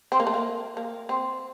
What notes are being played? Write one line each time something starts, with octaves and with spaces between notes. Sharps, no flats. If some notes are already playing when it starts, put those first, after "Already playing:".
C4
A#3
A3
A#3
A#3
C4